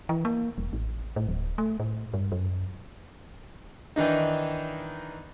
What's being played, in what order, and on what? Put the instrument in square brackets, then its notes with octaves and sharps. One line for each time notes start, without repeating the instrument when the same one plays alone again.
[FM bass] E3
A#3
E1
A1
A2
D1
A3
A2
G2
F#2
[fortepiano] D#3 E3 D4 D#4